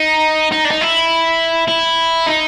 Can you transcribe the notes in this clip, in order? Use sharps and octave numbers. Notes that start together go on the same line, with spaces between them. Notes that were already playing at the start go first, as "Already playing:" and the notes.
Already playing: D#4
D#4
D4
D#4
E4
E4
D#4